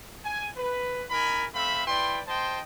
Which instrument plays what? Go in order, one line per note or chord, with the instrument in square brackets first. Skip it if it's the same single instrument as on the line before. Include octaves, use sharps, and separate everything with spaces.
[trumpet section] G#5
B4
D#4 A#4 G#5 B5
A3 C4 E5 F5 B5
E4 B4 D5 G5 C6
C5 D#5 G5 A5 C6